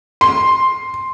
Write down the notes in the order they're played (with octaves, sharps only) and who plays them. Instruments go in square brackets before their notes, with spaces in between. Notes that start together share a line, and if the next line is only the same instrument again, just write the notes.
[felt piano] C6